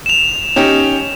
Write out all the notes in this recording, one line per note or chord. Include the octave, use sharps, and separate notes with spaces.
E7 F7
C#4 D#4 G4